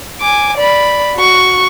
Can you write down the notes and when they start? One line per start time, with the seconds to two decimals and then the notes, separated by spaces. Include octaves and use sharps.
0.21 G#5 D6
0.57 D5 B5
1.16 F#4 C#6